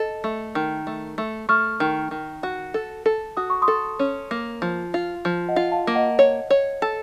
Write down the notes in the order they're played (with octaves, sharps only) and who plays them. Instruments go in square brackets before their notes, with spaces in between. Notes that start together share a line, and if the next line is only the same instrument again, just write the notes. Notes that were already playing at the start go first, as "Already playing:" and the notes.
Already playing: [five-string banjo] A4 [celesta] D#5
[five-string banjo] A3
D#3
A3
A3
[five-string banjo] A3 [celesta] C#6 F6
[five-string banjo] D#3
D#3
F#4
A4
A4
[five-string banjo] F#4 [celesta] D#6
[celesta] C#6
C6 D#6
[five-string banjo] A4
C#4
A#3
F3
F4
F3
[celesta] D#5 F#5
[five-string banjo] F4
[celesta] F5 A5
[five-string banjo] A#3
[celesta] D#5 F#5
[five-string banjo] C#5
C#5
A4